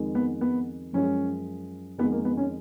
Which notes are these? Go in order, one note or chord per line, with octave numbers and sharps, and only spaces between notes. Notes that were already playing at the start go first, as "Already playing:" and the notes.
Already playing: F2 D#3 G#3
B3
B3
F#2 F3 G#3 C#4
F2 D#3 G#3 B3
A#3
B3
C#4